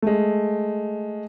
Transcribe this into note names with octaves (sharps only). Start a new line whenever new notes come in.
G#3 A3